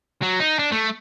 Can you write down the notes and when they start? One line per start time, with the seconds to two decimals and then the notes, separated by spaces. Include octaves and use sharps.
0.22 F#3
0.40 D#4
0.59 D4
0.72 A3